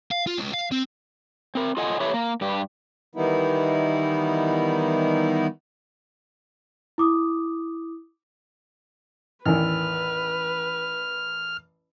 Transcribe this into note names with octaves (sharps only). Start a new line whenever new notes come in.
F5
F4
C#2
F5
C4
C4 A#4
F4 A4 D#5 F#5 G#5
E4 G4 A4 B4 C#5 E5
A#3
G2 G4
D#3 E3 G3 B3 D#4 E4
E4 D6 D#6
A1 E2 D#3 B4 F6